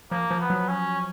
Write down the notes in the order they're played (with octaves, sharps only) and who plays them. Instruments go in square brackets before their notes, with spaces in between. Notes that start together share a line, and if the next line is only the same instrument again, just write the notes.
[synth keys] F3 [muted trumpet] A#3
[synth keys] F3
[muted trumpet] B3
[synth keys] F#3
[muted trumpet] C#4